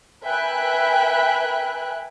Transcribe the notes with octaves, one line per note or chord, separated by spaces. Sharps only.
A#4 B4 E5 G5 G#5 F#6